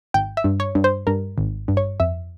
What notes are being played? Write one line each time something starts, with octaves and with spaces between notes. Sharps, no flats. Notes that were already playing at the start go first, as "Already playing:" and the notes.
G#1 G5
E5
G2
C#5
G2
C5
G2 A#4
G#1
G2
C#5
F2 E5